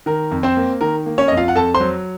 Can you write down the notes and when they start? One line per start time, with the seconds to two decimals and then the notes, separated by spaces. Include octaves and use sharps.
0.06 D#3 A#4
0.31 F2
0.43 C4 C5
0.57 A#3
0.81 D#3 A#4
1.06 A#3
1.18 C#4 C#5
1.28 F2 D#5
1.37 F4 F5
1.48 F#5
1.55 F2 A4 A5
1.74 C5 C6
1.80 F#3